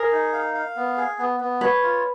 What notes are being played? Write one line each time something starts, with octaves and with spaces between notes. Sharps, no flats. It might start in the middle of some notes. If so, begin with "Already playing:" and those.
Already playing: G#4 A#4
D#4
F5
F5
B3
G#4
B3
B3
B4 C#5
F4